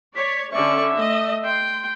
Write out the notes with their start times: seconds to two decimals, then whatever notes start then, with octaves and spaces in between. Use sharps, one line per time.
0.16 C#5 D5 B6
0.52 D3 C#4 D5 E5 C#6
0.97 A3 D#5
1.44 G5 C6